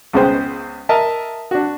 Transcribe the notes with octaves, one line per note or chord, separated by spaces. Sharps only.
C#2 C#3 G#3 B3 C5 G5
A#4 D#5 E5 A5
D4 F#4